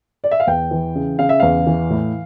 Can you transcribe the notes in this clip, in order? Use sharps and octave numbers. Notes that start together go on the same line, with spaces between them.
D5
E5
F5
E2 G5
E3
C#3
C#3 F5
E5
E2 F5
E3
A2